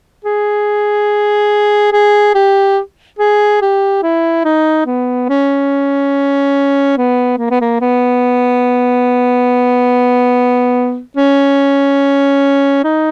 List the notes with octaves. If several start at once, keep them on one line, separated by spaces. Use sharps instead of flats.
G#4
G#4
G4
G#4
G4
E4
D#4
B3
C#4
B3
A#3
B3
A#3
B3
C#4
D#4